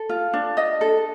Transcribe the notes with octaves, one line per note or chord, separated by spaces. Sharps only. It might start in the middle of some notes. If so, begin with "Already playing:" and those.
Already playing: A4
F4
D4
D#5
A4